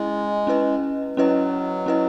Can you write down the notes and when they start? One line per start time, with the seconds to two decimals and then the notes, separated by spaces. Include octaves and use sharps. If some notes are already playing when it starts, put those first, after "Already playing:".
Already playing: G#3 C#4 E4 D#5
0.47 C#4 E4 B4 D#5
1.16 F#3 C#4 E4 B4 D#5
1.86 C#4 E4 B4 D#5